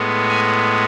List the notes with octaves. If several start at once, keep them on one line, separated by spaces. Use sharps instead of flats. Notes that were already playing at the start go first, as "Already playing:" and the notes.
Already playing: A2 G#3 B3
G#5